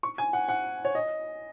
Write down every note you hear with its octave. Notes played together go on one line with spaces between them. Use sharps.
C#6
G#5
F#5
F#5
C#5
D#5